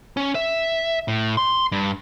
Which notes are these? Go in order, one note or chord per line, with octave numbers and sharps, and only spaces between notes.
C#4
E5
A2
C6
G2